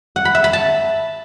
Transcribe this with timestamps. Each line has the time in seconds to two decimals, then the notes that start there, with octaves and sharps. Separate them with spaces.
0.16 F#5
0.25 B5
0.35 E5
0.44 B5
0.53 A5